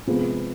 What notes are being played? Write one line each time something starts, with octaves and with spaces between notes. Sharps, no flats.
C3 F3 G#3 B3